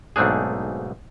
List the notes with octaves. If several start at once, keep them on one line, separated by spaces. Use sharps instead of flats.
B1 G#2 A3 C4 D4 G#4